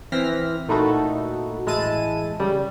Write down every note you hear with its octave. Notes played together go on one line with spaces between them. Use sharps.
E3 C4 F6 A#6 B6
A#2 A3 D#4 E4 F#4 A4
A1 G#3 E4 A5 D#7
C#3 G3